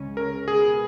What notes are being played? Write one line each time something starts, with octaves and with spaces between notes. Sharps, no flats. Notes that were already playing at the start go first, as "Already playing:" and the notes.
Already playing: C#2 C#3 G#3 C#4
A#4
B2 G#3 B3 G#4